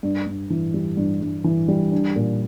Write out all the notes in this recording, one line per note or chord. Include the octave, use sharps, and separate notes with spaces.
G2
G2
E3
G3
G2
G2
E3
G3
D4
A#2